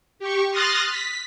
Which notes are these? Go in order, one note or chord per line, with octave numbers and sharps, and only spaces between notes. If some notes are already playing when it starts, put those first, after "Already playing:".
G4 C#6
C6 D#6 F6 F#6 A6 A#6
B6